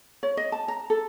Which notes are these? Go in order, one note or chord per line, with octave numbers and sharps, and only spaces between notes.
C#5
D#5
A5
A#5
A4